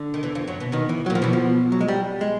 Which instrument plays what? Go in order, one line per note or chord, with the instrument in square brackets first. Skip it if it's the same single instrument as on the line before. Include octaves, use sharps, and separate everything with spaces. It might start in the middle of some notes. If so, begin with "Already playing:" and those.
Already playing: [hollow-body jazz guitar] D3
[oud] D#3
E2 E3
F2 F3
F#2 F#3
B2 B3
[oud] B2 B3 [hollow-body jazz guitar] D#3
[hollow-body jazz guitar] E3
[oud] A#2 A#3 [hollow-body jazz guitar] F#3
[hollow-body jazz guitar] F3
[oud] B2 B3 [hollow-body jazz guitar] E3
[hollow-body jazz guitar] F3
F#3
G#3
G3
G#3